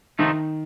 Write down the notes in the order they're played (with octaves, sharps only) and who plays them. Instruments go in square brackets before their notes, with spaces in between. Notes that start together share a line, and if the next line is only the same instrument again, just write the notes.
[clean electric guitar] C3 F3 A3 D#4 [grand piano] D#3